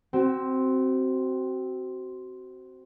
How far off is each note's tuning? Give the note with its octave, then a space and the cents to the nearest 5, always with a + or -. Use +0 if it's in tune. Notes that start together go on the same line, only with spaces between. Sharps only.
C4 +0 F#4 +30